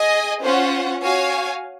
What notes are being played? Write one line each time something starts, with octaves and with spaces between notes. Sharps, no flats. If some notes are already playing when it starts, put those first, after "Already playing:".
Already playing: G#4 D#5 G#5
C#4 F4 C5 F#5
F#4 C#5 F5 G#5